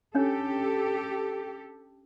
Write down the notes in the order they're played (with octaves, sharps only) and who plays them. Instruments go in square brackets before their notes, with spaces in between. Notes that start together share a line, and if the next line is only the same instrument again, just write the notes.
[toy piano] C#4 D4 C#5 [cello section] G4 A4